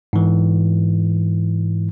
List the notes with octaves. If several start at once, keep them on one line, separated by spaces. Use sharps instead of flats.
G#2 E3